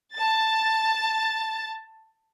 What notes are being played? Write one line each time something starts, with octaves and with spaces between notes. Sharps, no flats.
A5 A6